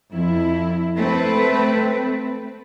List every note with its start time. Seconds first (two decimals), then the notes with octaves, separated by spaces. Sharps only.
0.12 F2 E4
0.96 A3 C4 B4